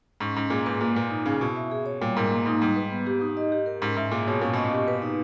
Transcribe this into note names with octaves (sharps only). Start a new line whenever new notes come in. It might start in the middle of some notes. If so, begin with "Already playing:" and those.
G#2 C#4
G#2 C#4
A#2 G#4
G#2 B4
A#2 A#3
A#2 B4
D#4
C#3 G#4
B2 E4
E5
G#4
C#5
A#2 G3
G#2 A#4
A#3
G#2 D#4
G#2 G3
B4
B3
G4
D#4
D#5
G4
A#4
G#2 C#4
G#2 E5
A#2 G#4
B2 C#5
A#2 C#4
B2 D#5
A#2
G4
B4
D#4